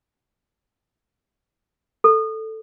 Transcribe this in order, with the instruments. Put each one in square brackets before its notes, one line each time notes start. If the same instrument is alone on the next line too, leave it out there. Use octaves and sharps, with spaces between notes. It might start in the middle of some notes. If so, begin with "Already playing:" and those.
[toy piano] A4